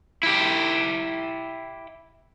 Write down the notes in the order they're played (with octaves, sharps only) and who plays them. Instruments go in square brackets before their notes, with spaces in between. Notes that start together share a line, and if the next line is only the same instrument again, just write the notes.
[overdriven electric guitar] E4 G4